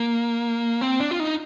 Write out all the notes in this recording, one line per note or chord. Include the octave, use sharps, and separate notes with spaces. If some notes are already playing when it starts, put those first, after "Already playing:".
Already playing: A#3
C4
D4
F4
D#4